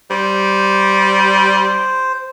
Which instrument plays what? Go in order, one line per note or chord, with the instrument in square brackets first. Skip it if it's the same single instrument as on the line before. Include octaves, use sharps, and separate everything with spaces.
[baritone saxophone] G3 [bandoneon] C5